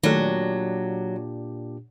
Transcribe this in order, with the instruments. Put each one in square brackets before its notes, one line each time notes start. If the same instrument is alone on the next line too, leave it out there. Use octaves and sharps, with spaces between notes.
[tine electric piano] A#2 D4 G4 [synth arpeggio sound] D#3 A3 [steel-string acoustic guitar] F#3